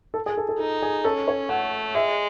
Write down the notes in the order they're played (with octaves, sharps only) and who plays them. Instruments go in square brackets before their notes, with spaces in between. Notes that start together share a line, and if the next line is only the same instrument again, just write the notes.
[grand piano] A4
G#4
A4
A4
[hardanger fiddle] D#4 [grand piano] A4
[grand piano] G#4
[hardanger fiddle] C#4 [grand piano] A4
[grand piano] C#5
[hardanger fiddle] A3 [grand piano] F#5
[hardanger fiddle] G#3 [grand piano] E5